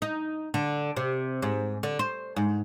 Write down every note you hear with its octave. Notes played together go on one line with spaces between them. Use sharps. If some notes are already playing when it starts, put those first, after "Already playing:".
D#4
D3
C3
G#2
D3
C5
G#2